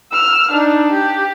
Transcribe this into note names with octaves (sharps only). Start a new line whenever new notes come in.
E6 F6
D4 D#4
G4